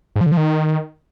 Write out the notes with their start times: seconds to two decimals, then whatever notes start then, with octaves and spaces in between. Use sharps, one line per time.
0.16 G#2
0.21 F3
0.26 D3
0.32 F3
0.37 D#3